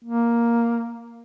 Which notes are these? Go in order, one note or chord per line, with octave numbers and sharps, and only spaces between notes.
A#3